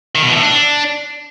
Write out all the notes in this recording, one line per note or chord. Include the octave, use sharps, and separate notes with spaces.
D#3
B2
E3
A2
D4